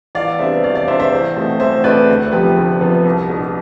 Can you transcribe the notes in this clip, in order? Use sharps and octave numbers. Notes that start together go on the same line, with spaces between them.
E2 D5 F5
C3 G3 B3 D4 C5 E5
E2 D5 F5
D5 F5
C3 G3 B3 D4 C5 E5
C5 E5
E2
B2 A3 C4
E2 C5 E5
B2 A3 C4 B4 D5
D2
C3 F3 B3 G4 B4
D2
C3 F3 B3
C2
B2 B3 D4